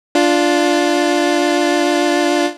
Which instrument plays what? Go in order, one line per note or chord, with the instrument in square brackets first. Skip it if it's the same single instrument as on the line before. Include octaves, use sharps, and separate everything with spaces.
[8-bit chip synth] D4 F4